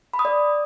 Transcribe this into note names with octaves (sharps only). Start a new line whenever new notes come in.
B5
D#6
D5